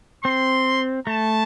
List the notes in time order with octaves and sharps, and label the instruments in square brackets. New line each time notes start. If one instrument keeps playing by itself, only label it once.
[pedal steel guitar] C4 [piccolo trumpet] C6
[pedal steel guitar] A3 [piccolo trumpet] A5